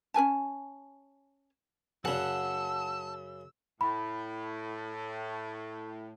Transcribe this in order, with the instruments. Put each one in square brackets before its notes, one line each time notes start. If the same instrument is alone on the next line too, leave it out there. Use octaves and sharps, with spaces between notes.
[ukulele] C#4 A#4 G#5 A5
[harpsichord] F#2 C#3 [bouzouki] F#5 [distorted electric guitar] A5 [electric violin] E6
[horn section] A2 [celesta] B5